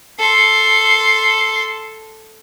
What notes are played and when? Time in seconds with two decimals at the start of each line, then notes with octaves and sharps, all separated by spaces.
0.19 A4 C6